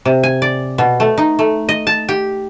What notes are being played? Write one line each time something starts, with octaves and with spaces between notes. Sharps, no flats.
C3
G#5
D5
B2
A3
D#4
A3
D#5
A5
G4